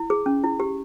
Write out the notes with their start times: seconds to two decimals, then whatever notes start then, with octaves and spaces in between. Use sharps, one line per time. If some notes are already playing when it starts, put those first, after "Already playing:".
Already playing: E4
0.10 G#4
0.26 C#4
0.44 E4
0.60 G4